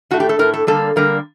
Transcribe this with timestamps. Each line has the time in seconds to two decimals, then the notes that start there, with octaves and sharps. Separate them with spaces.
0.11 A2 A3 F#4
0.20 G4
0.29 A4
0.39 A2 A3 A#4
0.54 A4
0.67 D3 G3 A#3 A4
0.96 D3 G3 A#3 A#4